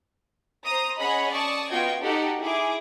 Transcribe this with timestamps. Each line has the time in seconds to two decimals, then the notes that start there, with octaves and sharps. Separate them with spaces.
0.65 C5 A#5 D#6
0.99 C#4 G#4 C#5 D#5 F#5 B5
1.30 D5 A5 C#6 D#6
1.69 B3 F4 F#4 D#5 G5 G#6
2.02 D#4 F#4 G4 A4 F#5
2.40 E4 G#4 D6